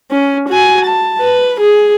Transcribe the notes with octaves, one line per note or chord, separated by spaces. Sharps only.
C#4
F#4 G#5
A5
B4
G#4